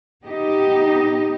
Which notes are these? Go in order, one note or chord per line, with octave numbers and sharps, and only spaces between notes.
B3 D#4 G4 D#5